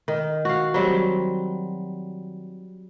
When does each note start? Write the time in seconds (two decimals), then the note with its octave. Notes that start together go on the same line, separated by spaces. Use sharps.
0.08 D#3
0.45 F#4 F5
0.74 F#3 G3 C4